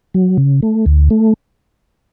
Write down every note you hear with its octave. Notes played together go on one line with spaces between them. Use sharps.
F#3
C#3
A3
D2
A3